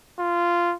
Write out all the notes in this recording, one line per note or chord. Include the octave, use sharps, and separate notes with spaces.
F4